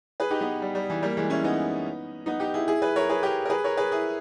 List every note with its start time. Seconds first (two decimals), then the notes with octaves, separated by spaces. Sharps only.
0.20 G#4 B4
0.31 D#4 G4
0.41 B3 D#4
0.62 G3
0.75 G3
0.90 E3
1.03 G3 A#3
1.17 E3 G#3
1.30 C#4 E4
1.44 B3 D#4
2.26 B3 D#4
2.40 D#4 G4
2.54 E4 G#4
2.68 E4 G#4
2.82 G#4 B4
2.96 A#4 C#5
3.09 G#4 B4
3.23 G4 A#4
3.45 A#4
3.50 G#4 B4
3.64 A#4 C#5
3.77 G#4 B4
3.92 E4 G#4